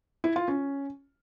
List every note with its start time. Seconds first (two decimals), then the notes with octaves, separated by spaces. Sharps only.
0.24 E4
0.36 F4
0.48 C#4